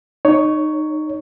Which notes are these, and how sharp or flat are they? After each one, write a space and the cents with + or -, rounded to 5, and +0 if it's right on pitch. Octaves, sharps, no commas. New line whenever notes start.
D#4 -20 C#5 +10